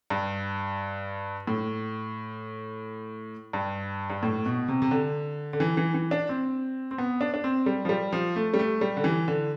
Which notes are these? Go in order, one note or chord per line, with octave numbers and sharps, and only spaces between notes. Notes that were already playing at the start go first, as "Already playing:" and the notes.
G2
A2
G2
G2
A2
B2
C3
C3
D3
D3
E3
E3
E3
D4
C4
C4
B3
D4
D4
C4
G3
F3
G3
F3
A3
G3
A3
G3
D3
E3
D3